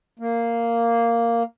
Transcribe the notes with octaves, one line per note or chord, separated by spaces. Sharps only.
A#3